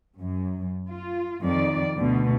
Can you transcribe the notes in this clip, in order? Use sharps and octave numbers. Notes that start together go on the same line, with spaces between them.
F#2
F4
F2 D#3 D5
D2 B2 D3